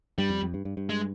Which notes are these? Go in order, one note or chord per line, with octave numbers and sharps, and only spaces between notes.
G2 G3
F2
F2
G2
G2
G2
G#3